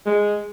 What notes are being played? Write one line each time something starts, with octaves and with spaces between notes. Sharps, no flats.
G#3